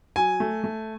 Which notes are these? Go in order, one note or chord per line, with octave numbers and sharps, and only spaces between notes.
F#3 G#5
A3
A3